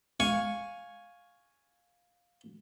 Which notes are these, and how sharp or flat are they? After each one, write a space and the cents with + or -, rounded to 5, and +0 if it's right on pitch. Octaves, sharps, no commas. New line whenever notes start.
F5 +10 G#5 +0 C#6 +0